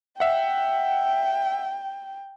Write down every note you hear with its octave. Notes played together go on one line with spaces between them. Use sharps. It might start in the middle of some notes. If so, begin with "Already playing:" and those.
E5 F#5 G5